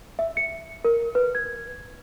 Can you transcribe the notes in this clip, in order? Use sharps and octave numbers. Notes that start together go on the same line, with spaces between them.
E5
C#7
A#4
B4
G#6